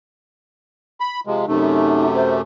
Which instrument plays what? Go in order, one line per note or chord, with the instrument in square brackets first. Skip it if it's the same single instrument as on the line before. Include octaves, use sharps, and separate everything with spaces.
[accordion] B5
C3 F3 G#3
[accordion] F#2 C3 A3 [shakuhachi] D#4
[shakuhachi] C5